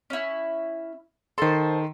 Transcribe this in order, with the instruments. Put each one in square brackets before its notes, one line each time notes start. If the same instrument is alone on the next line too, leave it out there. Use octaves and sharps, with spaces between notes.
[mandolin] C#4 E4
[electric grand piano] D#3 C6 [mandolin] A4 C5